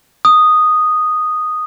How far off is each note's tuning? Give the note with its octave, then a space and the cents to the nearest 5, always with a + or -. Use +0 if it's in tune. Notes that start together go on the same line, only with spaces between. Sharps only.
D#6 -5